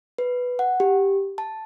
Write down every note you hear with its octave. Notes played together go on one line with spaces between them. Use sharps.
B4
F#5
G4
A5